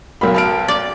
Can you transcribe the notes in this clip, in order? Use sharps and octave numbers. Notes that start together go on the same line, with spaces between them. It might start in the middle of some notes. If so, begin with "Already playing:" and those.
B1 A#4 F5 B5
A5 F6 D7
D5